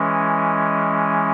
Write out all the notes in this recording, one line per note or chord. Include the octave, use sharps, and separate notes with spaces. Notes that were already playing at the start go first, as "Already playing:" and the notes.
Already playing: E3 G#3 C#4